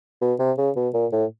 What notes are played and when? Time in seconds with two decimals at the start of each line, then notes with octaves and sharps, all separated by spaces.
0.22 B2
0.39 C3
0.58 C#3
0.76 B2
0.94 A#2
1.12 A2